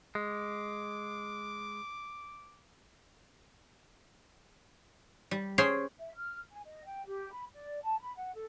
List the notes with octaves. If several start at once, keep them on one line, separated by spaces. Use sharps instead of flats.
G#3 D6
G3
C#4 G#4 C5 G5 C6
E5
F6
G#5
D#5
G5
G4
B5
D5
A5
B5
F#5
A4